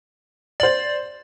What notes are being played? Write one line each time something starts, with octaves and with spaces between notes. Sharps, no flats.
C5 D5 F#7